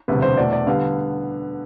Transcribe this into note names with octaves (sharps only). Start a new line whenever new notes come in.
E1 D2 C3 G3 B4
C5
E2 B2 A3 D5
D5
D3 G3 B3 F5